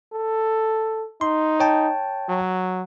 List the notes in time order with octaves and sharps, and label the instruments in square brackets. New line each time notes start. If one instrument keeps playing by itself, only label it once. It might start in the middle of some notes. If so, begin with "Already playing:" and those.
[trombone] A4
[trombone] D#4 [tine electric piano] C6
[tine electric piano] C#5 G5 A5
[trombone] F#3